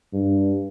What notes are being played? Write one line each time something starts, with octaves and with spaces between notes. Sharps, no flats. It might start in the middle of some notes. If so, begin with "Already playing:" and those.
G2